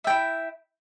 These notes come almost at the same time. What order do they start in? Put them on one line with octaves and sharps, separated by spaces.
E5 G5 E4